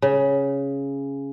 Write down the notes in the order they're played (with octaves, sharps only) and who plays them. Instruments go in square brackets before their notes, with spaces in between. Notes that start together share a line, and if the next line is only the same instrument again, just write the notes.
[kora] C#3